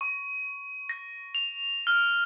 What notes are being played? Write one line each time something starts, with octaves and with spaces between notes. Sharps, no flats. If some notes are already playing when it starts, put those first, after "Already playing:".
C#6
A#6
F7
F6